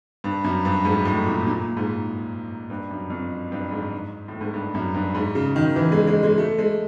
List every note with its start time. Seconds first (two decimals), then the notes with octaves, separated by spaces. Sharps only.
0.24 G2
0.44 F#2
0.65 G2
0.85 G#2
1.05 A2
1.26 A#2
1.46 A#2
1.77 G#2
2.70 G2
2.91 F#2
3.10 F2
3.52 G2
3.71 G#2
4.28 A2
4.41 G#2
4.54 G2
4.74 F#2
4.94 G2
5.15 G#2
5.35 C#3
5.56 D#3
5.76 E3
5.92 G#3
6.07 G#3
6.23 G#3
6.38 A3
6.58 G#3